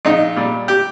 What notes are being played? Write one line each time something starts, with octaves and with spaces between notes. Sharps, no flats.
A#1 D#4
A#2 G3
G4